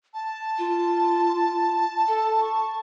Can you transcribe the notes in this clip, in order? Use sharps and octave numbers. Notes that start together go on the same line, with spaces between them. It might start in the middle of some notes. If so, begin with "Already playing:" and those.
A5
F4
A4
C#6